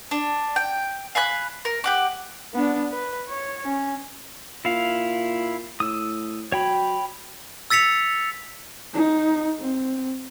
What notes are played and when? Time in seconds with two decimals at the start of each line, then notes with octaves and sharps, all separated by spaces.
0.11 D4
0.56 G5
1.15 F5 G#5 B5 F#6
1.65 A#4
1.84 G4 F#5 D6
2.54 B3 D4
2.92 B4
3.29 C#5
3.64 C#4
4.65 A#2 E4 F5
5.80 A2 D#6 E6
6.52 F#3 C#5 G5 B5
7.70 E6 A6 B6 C#7 F7
8.94 D#4
9.60 C4